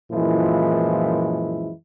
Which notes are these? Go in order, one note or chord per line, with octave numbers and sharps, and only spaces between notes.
F#2 A#2 E3 F3 G#3 E4